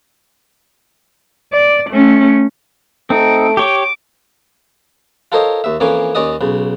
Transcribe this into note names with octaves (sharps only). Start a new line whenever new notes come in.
D5
A3 C#4
A3 C4 D#4 D7
G4 C#5 D6
F4 A4 A#4 C5 C#5 D#5
D#2 E5
F2 E3 A#3 C#4 G#5 D6
D#2 C#4 D5 D#5 D#6
B1 C#3